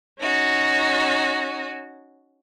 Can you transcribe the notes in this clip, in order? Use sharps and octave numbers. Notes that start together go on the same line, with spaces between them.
C#4 D#4 F#4